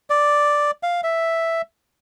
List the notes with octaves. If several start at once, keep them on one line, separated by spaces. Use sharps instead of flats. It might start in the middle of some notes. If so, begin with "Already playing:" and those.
D5
F5
E5